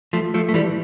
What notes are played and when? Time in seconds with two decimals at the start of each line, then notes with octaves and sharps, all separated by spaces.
0.13 F3 A3
0.34 F3 A3
0.49 A3
0.54 E3 G3